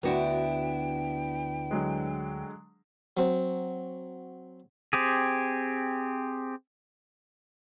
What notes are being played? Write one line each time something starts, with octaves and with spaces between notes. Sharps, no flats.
D2 B3 D4 E4 F#4 G5
D3 F#3 G#3
F#3 C4
C4 G4 G#4